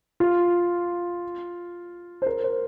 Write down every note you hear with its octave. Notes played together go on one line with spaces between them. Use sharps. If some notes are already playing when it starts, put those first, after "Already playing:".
F4
C5
A#4
C5